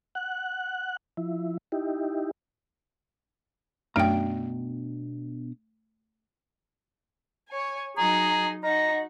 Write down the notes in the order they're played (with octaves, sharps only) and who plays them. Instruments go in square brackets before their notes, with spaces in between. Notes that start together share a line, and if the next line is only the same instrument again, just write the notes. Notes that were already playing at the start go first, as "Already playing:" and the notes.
[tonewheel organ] F#5 F#6
F3 E4
D#4 E4 G4
[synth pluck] F#2 D7 [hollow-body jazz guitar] B2 D4 A#5 [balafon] A3 G5
[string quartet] C#5 G#5
[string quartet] F#3 D#4 D#5 [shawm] G#4 [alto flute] A#5
[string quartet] D#4 F#4 [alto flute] D#5 [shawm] A#5